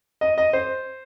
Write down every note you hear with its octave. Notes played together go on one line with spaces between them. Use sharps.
D#5
D#5
C5